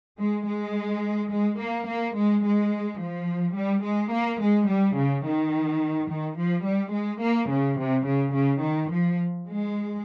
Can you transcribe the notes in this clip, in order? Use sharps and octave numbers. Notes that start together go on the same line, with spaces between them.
G#3
G#3
G#3
A#3
A#3
G#3
G#3
F3
G3
G#3
A#3
G#3
G3
C#3
D#3
D#3
F3
G3
G#3
A#3
C#3
C3
C#3
C#3
D#3
F3
G#3